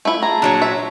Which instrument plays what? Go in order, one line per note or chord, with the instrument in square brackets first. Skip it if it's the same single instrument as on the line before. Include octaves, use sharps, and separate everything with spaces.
[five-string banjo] A3 E4 [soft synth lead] F4
[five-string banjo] G#4 [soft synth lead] A5 [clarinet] A#5
[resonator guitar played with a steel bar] A#2 F#3 C#5 [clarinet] D4
[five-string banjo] E5